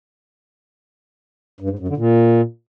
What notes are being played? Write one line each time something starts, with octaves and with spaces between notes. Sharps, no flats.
G2
G#2
F#2
D3
A#2